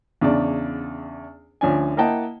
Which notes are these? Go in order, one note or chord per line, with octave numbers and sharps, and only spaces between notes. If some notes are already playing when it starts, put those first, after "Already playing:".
E2 C#3 D4 D5
D2 F3 C#4 D5 G#5
A#3 E4 D#5 F#5 G5 A5